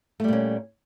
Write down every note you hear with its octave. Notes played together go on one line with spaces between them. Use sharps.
A#2 G3 A3 C#4